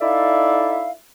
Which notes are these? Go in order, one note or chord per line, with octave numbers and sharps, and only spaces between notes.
D#4 E4 A4 D5 E5 F5